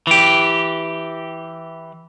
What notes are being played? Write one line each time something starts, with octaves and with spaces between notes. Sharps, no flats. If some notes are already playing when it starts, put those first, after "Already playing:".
E3 G4